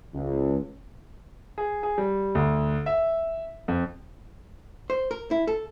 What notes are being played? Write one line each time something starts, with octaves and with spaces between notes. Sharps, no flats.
C#2
G#4
G#4
G3
D2
E5
F2
C5
A#4
E4
A4